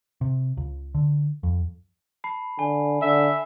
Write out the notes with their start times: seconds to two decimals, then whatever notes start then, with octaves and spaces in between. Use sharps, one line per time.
0.21 C3
0.57 C#2
0.95 D3
1.43 F2
2.24 A5 B5 C7
2.59 D3 G#5
3.02 D3 E5